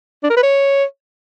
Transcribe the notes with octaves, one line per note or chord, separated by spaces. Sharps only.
D4
A#4
B4
C#5